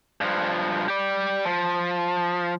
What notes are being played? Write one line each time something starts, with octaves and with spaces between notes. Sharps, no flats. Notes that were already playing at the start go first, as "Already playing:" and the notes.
G2 F3
G4 D5
F3